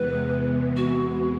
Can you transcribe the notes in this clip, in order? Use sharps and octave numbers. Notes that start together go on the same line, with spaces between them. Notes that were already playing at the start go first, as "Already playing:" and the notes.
Already playing: E2 C3 E3 G#3 B3 B4
F#4